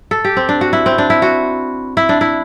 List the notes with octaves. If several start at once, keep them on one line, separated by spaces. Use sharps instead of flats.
A4
G4
C4
D4
F#4
E4
C4
D4
E4
F#4
E4
D4
E4